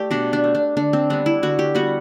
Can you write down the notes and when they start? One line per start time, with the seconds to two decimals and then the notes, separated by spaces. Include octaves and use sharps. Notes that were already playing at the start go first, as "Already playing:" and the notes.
Already playing: A3 G4 D5
0.11 B2 D4
0.33 D4
0.44 A3
0.55 D4
0.77 D3 D4
0.93 C4
1.10 G3 B3 D4
1.26 E4
1.43 D3 F#4
1.59 G4
1.75 G3 B3 F#4